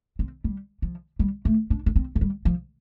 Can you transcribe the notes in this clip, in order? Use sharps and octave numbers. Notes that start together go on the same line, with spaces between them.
C4
G3
F3
G3
A3
D4
D4
C4
A3
G3
F3